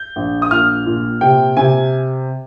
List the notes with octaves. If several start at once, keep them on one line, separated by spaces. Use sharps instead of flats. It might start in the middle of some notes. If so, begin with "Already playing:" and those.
Already playing: G6
A#1
D#6
A#2 F6
A#2
C3 G5
C3 G#5